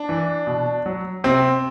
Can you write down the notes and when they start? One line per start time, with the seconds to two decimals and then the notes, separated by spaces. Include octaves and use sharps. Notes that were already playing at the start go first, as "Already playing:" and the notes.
Already playing: D4
0.09 E3
0.47 B2
0.86 F#3
1.24 C3 C4